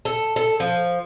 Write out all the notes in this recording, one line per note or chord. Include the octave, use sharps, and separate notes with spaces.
A4
A4
F3